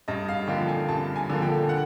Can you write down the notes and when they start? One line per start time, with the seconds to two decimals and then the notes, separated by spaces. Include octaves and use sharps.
0.08 G2 D#5
0.28 F5
0.48 D3 F3 A#3 G5
0.68 G#5
0.89 G2 A5
1.16 G#5
1.30 D3 F3 A#3
1.42 G5
1.69 F#5